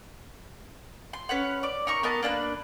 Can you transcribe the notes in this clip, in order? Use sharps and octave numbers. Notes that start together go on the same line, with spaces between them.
C6
C#4 B4 C#5 F#5
D5 D6
D#4 A#4 C#6
B3 A#4 D#5 A5
A#3 D4 A4 B4